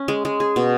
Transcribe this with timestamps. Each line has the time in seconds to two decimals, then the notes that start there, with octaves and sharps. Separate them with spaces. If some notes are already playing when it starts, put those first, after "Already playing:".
Already playing: C#4
0.08 G#3
0.25 G#3
0.40 G#4
0.56 B2